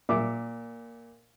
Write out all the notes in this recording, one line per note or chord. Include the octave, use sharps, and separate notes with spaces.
A#2 E5 D6